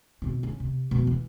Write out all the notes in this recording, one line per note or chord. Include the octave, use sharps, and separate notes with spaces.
B2 C4
C#4
C3
F2 B2
E3